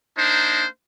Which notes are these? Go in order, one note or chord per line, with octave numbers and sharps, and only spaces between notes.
A#3 D4 D#4 C5